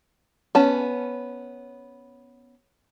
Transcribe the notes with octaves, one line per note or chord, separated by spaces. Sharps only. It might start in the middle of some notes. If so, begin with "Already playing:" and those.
B3 C#4 A5